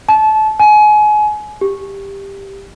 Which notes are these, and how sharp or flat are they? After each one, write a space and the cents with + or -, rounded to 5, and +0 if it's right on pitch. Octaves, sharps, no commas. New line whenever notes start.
A5 -25
G#5 +30
G4 +10